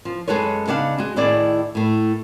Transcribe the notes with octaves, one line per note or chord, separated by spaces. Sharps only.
F3
F#2 G#3 F#4 A4 B4 C#5
C#3 B3 D4 D#4 F5 F#5
G#3 F#4
A2 D#3 E4 G#4 D5
A2 A3